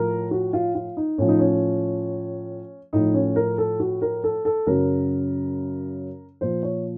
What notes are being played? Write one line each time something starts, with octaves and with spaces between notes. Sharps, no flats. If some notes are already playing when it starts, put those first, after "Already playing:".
Already playing: A2 F3 A#4
F#4
F4
F4
D#4
A2 F3 C#4
D#4
C#4
A2 F3 D#4
C#4
A#4
A4
F#4
A#4
A4
A4
F#2 C#3 F#3 A#4
A#2 F3 C5
C#5